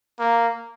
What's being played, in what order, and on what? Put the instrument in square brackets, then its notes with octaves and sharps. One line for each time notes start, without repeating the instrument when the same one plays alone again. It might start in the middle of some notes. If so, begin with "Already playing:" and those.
[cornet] A#3